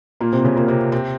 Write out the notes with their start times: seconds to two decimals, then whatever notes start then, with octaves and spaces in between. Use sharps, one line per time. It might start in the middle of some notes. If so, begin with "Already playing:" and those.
0.20 A#2 A#3
0.33 C3 C4
0.44 C#3 C#4
0.57 A#2 A#3
0.68 C3 C4
0.92 C3 C4